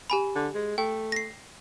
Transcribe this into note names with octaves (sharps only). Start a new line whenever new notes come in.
G4 G#5 B5
D3
G#3
A3 G5
A#6 C7